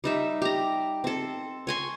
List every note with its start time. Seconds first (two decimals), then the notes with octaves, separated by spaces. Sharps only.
0.04 G3 D#4 E5
0.42 G4 A#5
1.04 C4 A4
1.67 C#5 G#5 C6